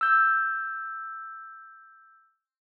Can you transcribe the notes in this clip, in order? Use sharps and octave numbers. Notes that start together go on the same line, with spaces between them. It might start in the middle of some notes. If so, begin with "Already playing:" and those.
E6 G6